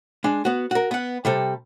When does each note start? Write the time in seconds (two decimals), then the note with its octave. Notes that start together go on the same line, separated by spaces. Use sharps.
0.24 G#3 D4
0.45 B3 F#4
0.71 F#4 A#4
0.91 B3 F#5
1.25 C3 G3 A4